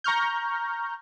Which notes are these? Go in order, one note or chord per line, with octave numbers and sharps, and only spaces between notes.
A#5 C#6 F6 G6